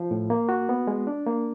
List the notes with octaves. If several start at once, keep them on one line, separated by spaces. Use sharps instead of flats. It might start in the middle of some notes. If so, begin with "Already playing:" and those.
Already playing: F3
A2
A#3
F#4
B3
G#3
D4
A#3